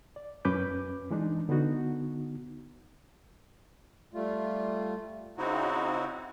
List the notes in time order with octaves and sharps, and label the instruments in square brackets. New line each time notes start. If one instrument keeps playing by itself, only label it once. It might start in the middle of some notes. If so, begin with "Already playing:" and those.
[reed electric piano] D5
F#2 C#4 B4 D6 G6
E3 G#3 D4 D#4
D3 B3 D#4 F#4
[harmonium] G3 A3 F4
[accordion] C#3 C4 D#4 E4 F#4